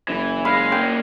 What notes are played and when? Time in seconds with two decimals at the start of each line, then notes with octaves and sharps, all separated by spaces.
0.08 F#1 E3
0.45 G#3 F5 B5
0.72 A#3 C#4 G5